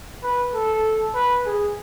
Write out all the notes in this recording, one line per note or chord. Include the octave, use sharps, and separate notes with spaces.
B4
A4
B4
G#4